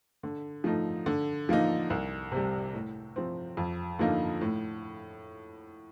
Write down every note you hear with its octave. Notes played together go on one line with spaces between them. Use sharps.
D3
F3 A3 D#4
D3
F3 A#3 D#4
C2
C3 G3
A2
F3 C4
F2
D3 F3 A#3 D#4
A2